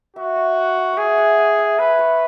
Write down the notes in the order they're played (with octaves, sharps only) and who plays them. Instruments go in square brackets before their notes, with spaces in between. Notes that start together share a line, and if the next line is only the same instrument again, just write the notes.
[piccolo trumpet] F#4 [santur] E5
[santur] F#5
F#5
[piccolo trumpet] G#4 [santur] C#5 E5
[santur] F#5
F#5
E5
[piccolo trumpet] B4 [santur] E5
[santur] C#5